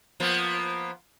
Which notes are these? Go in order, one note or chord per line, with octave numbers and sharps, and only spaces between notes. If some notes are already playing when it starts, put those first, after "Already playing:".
F3 A#3 B3